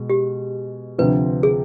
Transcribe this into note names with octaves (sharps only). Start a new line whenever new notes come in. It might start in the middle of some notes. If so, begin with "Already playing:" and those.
Already playing: B2 G#3
G4
D2 C3 F3 B4
G#4